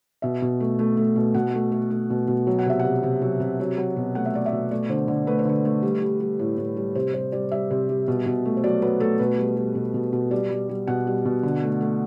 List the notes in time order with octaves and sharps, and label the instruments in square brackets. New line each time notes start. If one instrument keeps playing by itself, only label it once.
[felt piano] B2 E5
B2
A3
A3
A3
B2
B2 F#5
A3
A3
A3
B2
B2
F#3
F#5
C3 E5
F#5
C3
C3
F#3
C3
F#3
F#3
B2
A3 F#5
E5
A3 D5
E5
B2
A3 D5
D3 C5
D3
A3 B4
C5
D3 B4
A3
G3
G3
G3
A2
A2
G3
C3 C5
G3 C5
G3 D5
G3 E5
C3
G3
B2
B2
A3
C5
F#3 D5
F#3 B4
A3 A4
B2 B4
G3
G3
B2
B2
B2
G3 D5
G3
G3
B2 F#5
G3
B2
D3
A3
A3